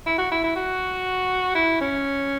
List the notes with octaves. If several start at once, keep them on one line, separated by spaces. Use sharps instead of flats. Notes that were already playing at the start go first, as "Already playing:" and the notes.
E4
F#4
E4
E4
F#4
E4
C#4